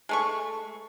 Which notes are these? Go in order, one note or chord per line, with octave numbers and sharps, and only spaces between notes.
G#3 A3 C#6